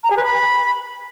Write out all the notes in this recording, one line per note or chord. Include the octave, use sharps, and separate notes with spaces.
A#5
G#4
B4
B5